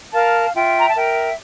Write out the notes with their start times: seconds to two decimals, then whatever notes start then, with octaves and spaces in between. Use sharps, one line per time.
0.14 A#4 F5 A5
0.55 F4 E5 G5
0.79 A#5
0.88 A5
0.95 A#4 E5 G5